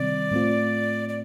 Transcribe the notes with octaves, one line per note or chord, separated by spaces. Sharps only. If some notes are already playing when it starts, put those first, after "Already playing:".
Already playing: C3 D#3 G3 C4 D5
A2 A3 C4 F4
D5